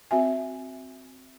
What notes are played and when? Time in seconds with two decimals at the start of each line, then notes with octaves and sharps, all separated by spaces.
0.11 C4 F#4 E5 G#5